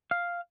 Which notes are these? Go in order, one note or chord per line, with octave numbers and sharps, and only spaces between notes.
F5